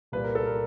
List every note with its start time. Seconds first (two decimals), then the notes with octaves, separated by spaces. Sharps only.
0.12 C2 A#2 B4
0.24 A#4
0.35 A4
0.46 A#4